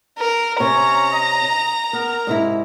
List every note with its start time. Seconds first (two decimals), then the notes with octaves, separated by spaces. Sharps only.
0.19 A#4
0.60 C3 C#4 C#5 A#5
1.12 D#5
1.93 B3 A#4
2.27 G#2 C3 E4